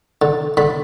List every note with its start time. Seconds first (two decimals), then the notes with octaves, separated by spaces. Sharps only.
0.22 D3
0.57 D3 B5